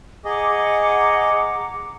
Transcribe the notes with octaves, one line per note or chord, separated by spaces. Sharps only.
G#4 D#5 F#5 A#5 D6